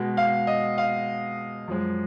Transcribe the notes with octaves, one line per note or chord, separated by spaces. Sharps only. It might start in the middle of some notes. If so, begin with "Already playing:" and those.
Already playing: B2 G#3
F5
D#5
F5
F#2 F3 G#3